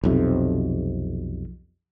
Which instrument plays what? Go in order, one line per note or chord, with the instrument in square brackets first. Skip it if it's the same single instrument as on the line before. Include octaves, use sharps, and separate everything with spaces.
[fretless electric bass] B1 F2 C3